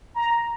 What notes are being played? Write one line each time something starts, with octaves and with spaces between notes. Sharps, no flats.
A#5